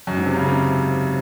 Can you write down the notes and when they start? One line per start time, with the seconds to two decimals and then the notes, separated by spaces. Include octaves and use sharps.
0.07 F#2
0.17 G#2
0.26 C3
0.36 C#3
0.46 C3